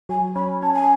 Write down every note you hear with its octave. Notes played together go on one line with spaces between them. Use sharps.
F#3 G#5
C#4 B5
C#4 A5
G#5